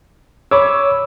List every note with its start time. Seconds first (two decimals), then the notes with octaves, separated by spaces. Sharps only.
0.51 C#5 B5 D6 E6